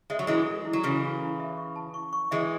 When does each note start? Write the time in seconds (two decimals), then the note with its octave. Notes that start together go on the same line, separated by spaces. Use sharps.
0.10 G#3 E5
0.19 F#3
0.27 E3 G#3 E4
0.46 A4
0.65 E4
0.73 F#3
0.83 C#3 E3 A4
1.02 E4
1.20 E4
1.40 E5
1.57 C#6
1.76 A5
1.94 C#6
2.13 C#6
2.31 E3 G#3 E5